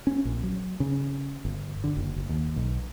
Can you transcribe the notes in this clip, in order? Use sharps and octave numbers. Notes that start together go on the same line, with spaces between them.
C#4
A#1
F#3
C#3
G1
D3
F#1
F#1
D#2
B1